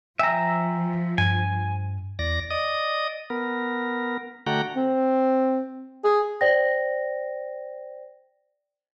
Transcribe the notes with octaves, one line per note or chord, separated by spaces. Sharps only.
F3 E5 G5 G#5 A#5 E6
G2 G#5
E2 D5 A#6
D5 D#5 D#6
B3 A#4
D3 A3 F#4 F#5 G5 A#5
C4
G#4
C5 D5 G5 A#6